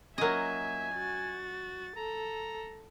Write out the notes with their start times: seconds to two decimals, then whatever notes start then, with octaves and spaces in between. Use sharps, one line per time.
0.18 F#3 A#3 C#4 F4 A#4 D#5 E5 G#5
0.94 F#4 A6
1.97 A4 A#5